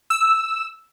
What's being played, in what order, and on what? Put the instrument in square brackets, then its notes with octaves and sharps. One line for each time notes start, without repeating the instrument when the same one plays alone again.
[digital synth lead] E6